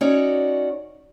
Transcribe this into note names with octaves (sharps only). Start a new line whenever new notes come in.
C#4 D#4 F#4 C#5 D5